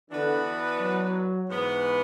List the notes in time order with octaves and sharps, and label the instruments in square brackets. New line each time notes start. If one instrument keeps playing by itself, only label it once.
[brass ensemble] D3 [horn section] E3 B3 D4 F#4 B4
[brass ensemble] F#3
[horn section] G#2 E3 B3